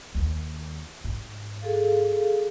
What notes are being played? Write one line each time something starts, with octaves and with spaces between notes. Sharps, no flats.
D#2
G#2
G#4 A4 F5